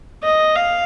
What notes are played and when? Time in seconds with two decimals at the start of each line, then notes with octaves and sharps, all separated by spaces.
0.23 D#5
0.56 F5